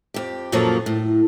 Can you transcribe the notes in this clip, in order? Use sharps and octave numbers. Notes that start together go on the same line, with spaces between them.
F2 G4
F#2 A#2 F3 F#3 A#3 A4
A2